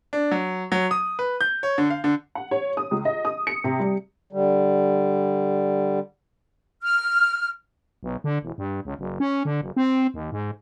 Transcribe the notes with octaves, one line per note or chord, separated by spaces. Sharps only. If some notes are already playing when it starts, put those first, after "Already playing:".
D4
F#3
F#3
D#6
B4
G6
C#5
D3
F5
D3
F#5
C#5
D#6
C#2
D#5
D#6
C#7
C3
G3
D3 G3
F6
B1
D3
E1
G2
C#2
F#1
C#4
D3
F#1
C4
D#2
G#2